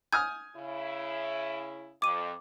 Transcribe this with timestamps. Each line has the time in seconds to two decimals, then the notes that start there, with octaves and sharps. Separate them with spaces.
0.12 G#5 D#6 F6 G6
0.56 C#3 E4
2.02 F2 D6 D#7